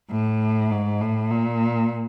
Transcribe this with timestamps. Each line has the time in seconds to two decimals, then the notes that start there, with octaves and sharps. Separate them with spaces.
0.10 A2
0.71 G#2
1.01 A2
1.31 A#2